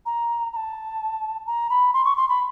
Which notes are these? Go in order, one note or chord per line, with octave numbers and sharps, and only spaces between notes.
A#5
A#5
A5
A#5
B5
C6
C#6
C6
B5